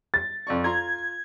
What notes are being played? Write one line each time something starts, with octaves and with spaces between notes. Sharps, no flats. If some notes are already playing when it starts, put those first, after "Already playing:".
A6
F2 D5 C#6
F4 A#5 C6 G#6